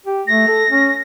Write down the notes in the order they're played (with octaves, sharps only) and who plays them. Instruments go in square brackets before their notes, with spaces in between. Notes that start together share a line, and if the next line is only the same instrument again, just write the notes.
[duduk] G4
[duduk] A3 [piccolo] A#6
[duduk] A4
C#4